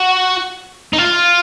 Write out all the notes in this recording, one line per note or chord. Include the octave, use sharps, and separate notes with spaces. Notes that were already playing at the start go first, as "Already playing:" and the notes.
Already playing: F#4
D#4
F4